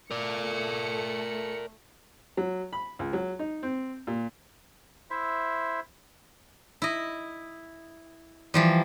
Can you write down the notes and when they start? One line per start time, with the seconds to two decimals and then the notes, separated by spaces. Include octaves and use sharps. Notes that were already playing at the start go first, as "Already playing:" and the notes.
0.11 A3 A#4 D5 C#7
2.37 F#3
2.73 B5
2.99 C#2
3.13 F#3
3.39 D#4
3.63 C4
4.07 A#2
5.10 E4 C5 E5
6.82 E4 D#5
8.54 E3 F3 G3